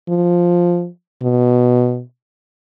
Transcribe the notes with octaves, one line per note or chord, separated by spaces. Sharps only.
F3
B2